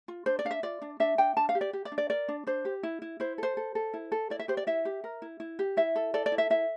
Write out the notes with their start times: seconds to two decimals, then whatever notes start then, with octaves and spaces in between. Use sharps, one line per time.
0.08 F4
0.26 D4 C5
0.39 D5
0.45 D4 F5
0.51 E5
0.63 F4 D5
0.82 D4
1.00 D4 E5
1.18 D4 G5
1.37 D4 A5
1.49 F5
1.55 G4
1.61 D5
1.73 G4
1.85 D5
1.92 D4
1.98 D5
2.10 A#4 D5
2.28 D4
2.47 D4 C5
2.65 G4
2.83 E4
3.02 E4
3.20 E4 C5
3.38 A4 C5
3.57 A4
3.75 A4
3.94 E4
4.12 A4
4.30 E4 D5
4.39 E5
4.48 G4 C5
4.57 D5
4.67 E4 E5
4.85 G4
5.04 A#4
5.22 E4
5.40 E4
5.59 G4
5.77 E4 E5
5.96 A4
6.14 A4 D5
6.26 D5
6.32 E4
6.38 E5
6.50 E4 E5